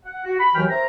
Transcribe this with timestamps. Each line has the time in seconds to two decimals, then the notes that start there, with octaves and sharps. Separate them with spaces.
0.05 F#5
0.25 F#4
0.40 B5
0.55 D#2 E3 F#3 F#4 G5 F6
0.70 C4 A#4 E5 A#5